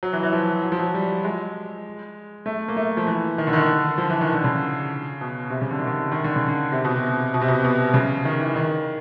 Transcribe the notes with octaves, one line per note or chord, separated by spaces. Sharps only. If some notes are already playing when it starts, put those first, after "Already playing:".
F#3
E3
E3
F3
F#3
F3
F#3
G3
G#3
A3
A#3
A3
F3
E3
D#3
D3
D#3
D3
F3
E3
D#3
D3
C#3
B2
C3
C#3
D3
D#3
D3
D#3
D3
C#3
D3
C3
B2
C3
B2
C3
B2
B2
C#3
D#3
E3
D#3